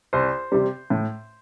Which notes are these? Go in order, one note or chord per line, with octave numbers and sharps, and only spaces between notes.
C2 C5
C3 G3
A2